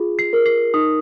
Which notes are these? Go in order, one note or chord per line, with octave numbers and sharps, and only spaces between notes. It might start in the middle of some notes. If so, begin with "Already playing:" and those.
Already playing: F4 G#4
C7
A#4
C7
D#4 D#6